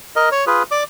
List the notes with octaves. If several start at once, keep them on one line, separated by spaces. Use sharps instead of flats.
A#4 D#5
C#5
F4 G#4 B4
D5 D6